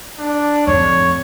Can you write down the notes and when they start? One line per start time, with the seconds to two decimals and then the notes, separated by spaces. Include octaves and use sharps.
0.19 D4
0.67 F2 A2 C#5